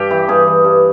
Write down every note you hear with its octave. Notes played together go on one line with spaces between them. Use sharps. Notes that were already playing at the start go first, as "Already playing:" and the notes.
Already playing: G2 G4
E3
G2 G#4
E3
G2